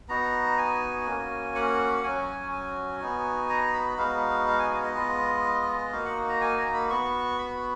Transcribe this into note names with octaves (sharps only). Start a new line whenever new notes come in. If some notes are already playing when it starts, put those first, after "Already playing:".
B3 D#4 F#4 A#5
G#5
A#3 C#4 F#4
F#5
F#3 C#4 F#4 G#5
G#5
B3 D#4 F#4
A#5
B5
G#3 B3 D#4 F#4 F5
F5
G#5
F5
D#5
G#3 B3 F4
A#3 D#4 F#4 F5
F#5
A#5
G#5
A#5
B5
B3 F#4 C#6
B5